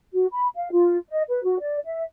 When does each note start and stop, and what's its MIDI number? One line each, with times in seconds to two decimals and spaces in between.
0.14 0.25 66
0.33 0.48 83
0.56 0.70 77
0.72 0.96 65
1.11 1.22 75
1.29 1.42 71
1.44 1.56 66
1.61 1.78 74
1.85 2.02 76